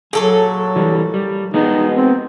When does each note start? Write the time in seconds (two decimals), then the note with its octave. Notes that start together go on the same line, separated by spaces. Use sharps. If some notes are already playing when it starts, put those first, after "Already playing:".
0.13 A#2 F#3 G#4 A4 C#5
0.76 E3 G3
1.14 G3
1.54 G#3 B3 D#4 G#4
1.95 C4